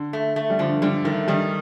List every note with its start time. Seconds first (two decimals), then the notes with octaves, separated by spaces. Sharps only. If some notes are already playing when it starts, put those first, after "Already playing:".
Already playing: D3
0.13 A3
0.36 A3
0.50 G3
0.59 D3 F3
0.82 D3 G3
1.05 D#3 A3
1.28 D#3 G3